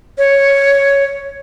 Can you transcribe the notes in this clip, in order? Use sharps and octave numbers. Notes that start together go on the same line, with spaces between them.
C#5